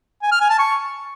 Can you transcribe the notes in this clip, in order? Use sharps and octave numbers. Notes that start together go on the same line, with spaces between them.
G#5
F6
G#5
A5
C#6